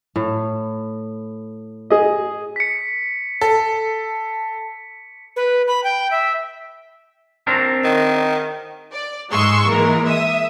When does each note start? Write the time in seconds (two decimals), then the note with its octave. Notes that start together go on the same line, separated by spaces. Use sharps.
0.16 A2
1.90 G#4 D#5
2.56 B6 C#7
3.41 A4
5.36 B4
5.67 B5
5.84 G5
6.11 E5
7.47 C4 D4 A#4
7.84 D#3
8.92 D5
9.32 G#2 G#3 G#4 C6 C#6 E6
9.69 E3 G#3 A#3 A#4
10.05 E5 D#6